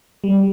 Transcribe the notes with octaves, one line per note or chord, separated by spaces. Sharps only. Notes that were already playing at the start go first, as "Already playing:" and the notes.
G3